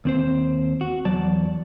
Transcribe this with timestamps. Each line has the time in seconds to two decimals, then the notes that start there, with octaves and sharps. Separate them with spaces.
0.05 D#2 C4 C5
0.81 F#4
1.05 E2 F#3 D5 A5